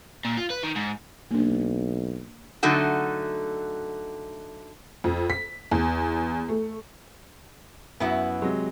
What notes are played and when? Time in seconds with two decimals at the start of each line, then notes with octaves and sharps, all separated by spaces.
0.25 A#2
0.37 F4
0.50 B4
0.63 D#3
0.76 G#2
1.31 B1 A#3 D4
2.63 D3 F#3 A3 D#4 F#4
5.04 F2
5.30 B6
5.71 E2
6.49 A3
8.00 F#2 B3 E4 F#4
8.42 C3 F#3 G#3